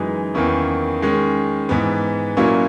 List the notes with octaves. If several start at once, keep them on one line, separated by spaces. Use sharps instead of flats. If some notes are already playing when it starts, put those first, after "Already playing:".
Already playing: F#2 E3 G#3 D#4
E2 D#3 A#3 C#4 E4
D#3 G#3 C#4
G#2 E3 B3
A#2 F#3 A#3 C#4 E4